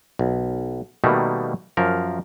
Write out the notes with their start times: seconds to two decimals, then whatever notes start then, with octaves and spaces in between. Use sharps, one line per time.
0.19 B1
1.04 B2 D#3 G3 A3 A#3
1.77 F#2 F3 A#4